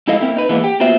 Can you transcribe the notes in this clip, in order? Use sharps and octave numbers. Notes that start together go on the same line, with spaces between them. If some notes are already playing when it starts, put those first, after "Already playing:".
F2 G#3 E4 A4 D#5 F5
A#3 C4 E4
D#4 B4
E3 G#3 A#3 B3
G4
A#3 B3 F4 F#4 C5 E5